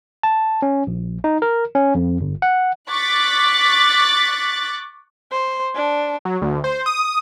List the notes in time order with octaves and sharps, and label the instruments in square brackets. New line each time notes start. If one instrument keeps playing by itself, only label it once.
[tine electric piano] A5
C#4
A#1
D#4
A#4
C#4
F2
G1
F#5
[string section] C#6 D6 F#6 A6 B6
[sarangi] C5
D4
[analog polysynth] F#3
D2
C5
D#6